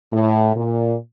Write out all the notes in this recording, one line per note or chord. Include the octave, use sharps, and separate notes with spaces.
A2
A#2